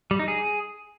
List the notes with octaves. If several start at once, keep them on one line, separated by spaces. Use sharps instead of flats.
G3
D#4
G#4